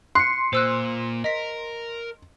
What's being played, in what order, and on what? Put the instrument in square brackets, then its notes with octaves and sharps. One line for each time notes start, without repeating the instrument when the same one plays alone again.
[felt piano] C6 [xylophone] F#6 [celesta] C7 C#7
[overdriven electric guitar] A#2 [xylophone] C5 E6 F#6
[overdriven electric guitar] A#4 [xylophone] D#5 B6